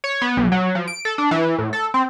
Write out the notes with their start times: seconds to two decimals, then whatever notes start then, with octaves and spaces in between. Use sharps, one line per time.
0.04 C#5
0.22 B3
0.37 B1
0.52 F#3
0.75 F3
0.88 D7
1.05 A4
1.18 D4
1.31 E3
1.58 A2
1.73 A4
1.94 C4